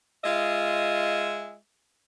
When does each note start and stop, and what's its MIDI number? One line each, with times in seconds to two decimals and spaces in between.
0.24 1.56 56
0.24 1.56 65
0.24 1.56 75
0.24 1.56 76